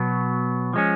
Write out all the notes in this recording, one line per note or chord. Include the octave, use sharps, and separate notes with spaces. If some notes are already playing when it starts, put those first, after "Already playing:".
Already playing: B2 F#3 B3
F3 G#3 C#4